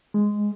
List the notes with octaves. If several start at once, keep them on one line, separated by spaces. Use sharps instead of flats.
G#3